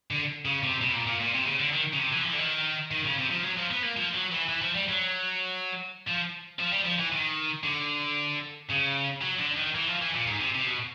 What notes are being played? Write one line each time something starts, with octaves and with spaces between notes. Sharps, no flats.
D3
C#3
C3
B2
A#2
A#2
A#2
C3
C#3
D3
D#3
C#3
C3
E3
F3
E3
D3
D#3
D#3
C#3
C3
F3
F#3
F3
B3
A#3
F3
F#3
E3
E3
F3
G3
F#3
F3
F3
G3
F3
E3
D#3
D3
C#3
F#3
D3
D#3
E3
F3
E3
A#2
G#2
C3
C3
B2